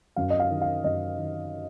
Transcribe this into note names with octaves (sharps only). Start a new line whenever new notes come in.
F#2 F5
D#5
F5
D#3
F5
F#2 D#5
D#3